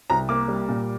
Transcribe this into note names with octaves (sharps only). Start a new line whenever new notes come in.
C2 A#5
A#3 D6
G3
A#2